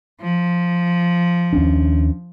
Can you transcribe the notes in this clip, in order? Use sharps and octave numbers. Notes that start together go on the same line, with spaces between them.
F3
D#2 C#4 D4